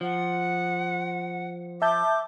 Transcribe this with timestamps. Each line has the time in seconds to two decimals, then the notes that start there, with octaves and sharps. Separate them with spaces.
0.01 F3 F#5
1.82 E5 A5 D6 G6